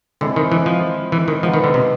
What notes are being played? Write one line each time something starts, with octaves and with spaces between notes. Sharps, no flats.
D3 G#3 C4 E4
D#3
E3
F3
E3
D#3
F3 G#3 B3 D#4
D#3
D3
C3